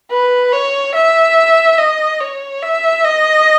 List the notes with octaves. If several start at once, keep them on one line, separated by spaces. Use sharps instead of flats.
B4
C#5
E5
D#5
C#5
E5
D#5